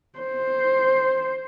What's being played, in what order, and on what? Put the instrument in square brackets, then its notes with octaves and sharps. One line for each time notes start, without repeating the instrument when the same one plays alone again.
[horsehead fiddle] C5